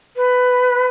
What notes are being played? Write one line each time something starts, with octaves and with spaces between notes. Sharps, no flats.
B4